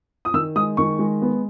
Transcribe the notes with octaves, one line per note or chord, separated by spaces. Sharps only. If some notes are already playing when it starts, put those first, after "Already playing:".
D#6
D#3 E6
G#3 D#6
D#3 C#6
G#3
B3